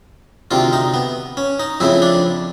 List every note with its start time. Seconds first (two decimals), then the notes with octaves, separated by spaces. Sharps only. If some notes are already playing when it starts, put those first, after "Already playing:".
0.51 D2 C3 D#3 F4
0.73 D#4
0.94 B3
1.37 C#4
1.59 D#4
1.80 F2 C#3 F3 A3 E4
2.02 D4